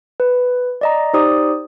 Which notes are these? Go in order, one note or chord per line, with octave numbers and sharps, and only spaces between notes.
B4
D5 D#5 A#5
D#4 G4 C5 D5 D#6